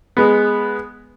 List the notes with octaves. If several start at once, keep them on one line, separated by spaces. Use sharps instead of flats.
G#3 B3